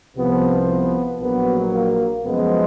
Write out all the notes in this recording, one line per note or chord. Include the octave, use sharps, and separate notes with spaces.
C2 C3 F3 B3
B3
A#1 A#2 F#3 A#3 B3
A#3
F#2 C#3 F3 G#3 B3